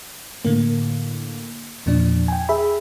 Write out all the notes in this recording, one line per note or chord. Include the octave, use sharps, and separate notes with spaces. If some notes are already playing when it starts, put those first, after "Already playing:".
A2 D3 A#3
E2 A#2 F3 D4
G5 G#5
G#4 E5 B5